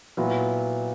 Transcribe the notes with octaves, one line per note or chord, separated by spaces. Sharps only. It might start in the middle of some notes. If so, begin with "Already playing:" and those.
A#2 F#3 B3 E4